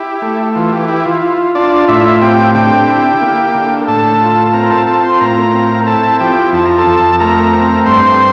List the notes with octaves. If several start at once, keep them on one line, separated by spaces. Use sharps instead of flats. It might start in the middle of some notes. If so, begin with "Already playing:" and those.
Already playing: E4 G4
A3
E3 F4
G4
E4 G4
F4
F4
D4 F4 D5
A2 E4 E5
C4 G4 G5
D3 G4 G5
E4
A#3
D3
A2 A4 A5
F4
A5
C4 A#4 A#5
A4 A5
F4 A4 A5
C5 C6
A2 A#4 A#5
C4
E4 A4 A5
F3 G4 G5
F2 A5
A#5
A4 A5
F2
A3 A#4 A#5
C4
G2 C5 C6